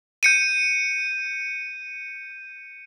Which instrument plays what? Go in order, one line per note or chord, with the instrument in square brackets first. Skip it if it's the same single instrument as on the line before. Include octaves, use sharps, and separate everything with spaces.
[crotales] G6 C#7 D#7